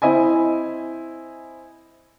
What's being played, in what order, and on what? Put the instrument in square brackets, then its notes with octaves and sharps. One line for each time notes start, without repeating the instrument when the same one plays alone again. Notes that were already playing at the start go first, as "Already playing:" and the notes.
[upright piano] C4 E4 D#5 G#5